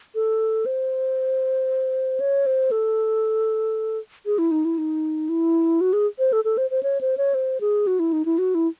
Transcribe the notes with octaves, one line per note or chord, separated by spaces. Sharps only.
A4
C5
C#5
C5
A4
G#4
E4
D#4
E4
D#4
E4
F#4
G#4
C5
A4
A4
C5
C5
C#5
C5
C#5
C5
G#4
F#4
E4
D#4
E4
F#4
E4